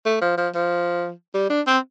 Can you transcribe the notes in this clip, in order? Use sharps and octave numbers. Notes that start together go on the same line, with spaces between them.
A3
F3
F3
F3
G3
D4
C4